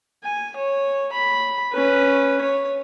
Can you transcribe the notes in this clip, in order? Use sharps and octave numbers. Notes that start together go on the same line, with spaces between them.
G#5
C#5
B5
C#4 B4
C#5